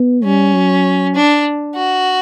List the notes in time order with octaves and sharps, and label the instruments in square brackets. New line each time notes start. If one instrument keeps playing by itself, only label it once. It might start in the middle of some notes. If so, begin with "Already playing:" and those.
Already playing: [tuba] B3
[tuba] G3 [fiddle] C#4
[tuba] F#3
[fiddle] D4
F#4